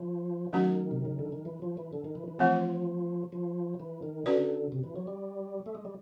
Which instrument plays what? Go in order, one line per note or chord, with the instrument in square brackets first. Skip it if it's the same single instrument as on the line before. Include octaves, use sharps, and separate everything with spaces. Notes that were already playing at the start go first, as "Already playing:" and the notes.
Already playing: [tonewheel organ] F3
[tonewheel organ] D#3 [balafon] F#3 A3 C#4 F#4
[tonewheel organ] C3
C#3
D3
D#3
E3
F3
E3
D3
D#3
E3
E3
[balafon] E3 A3 C4 [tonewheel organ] F3
[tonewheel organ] F3
E3
D#3
[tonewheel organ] D3 [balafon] C#4 F#4 B4 D5
[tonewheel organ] C3
E3
F#3
G3
A3
G#3
G3